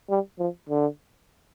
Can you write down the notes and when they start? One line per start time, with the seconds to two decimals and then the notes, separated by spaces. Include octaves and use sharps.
0.10 G3
0.39 F3
0.69 D3